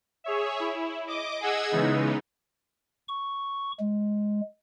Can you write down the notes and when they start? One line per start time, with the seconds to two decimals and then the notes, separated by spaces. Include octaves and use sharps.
0.24 G#4 C#5 E5
0.60 E4
1.08 D#5 D6
1.41 G#4 D#5 F#5 E6 G#6
1.71 C#3 E3 G#3 B3 D#4
3.08 C#6
3.80 G#3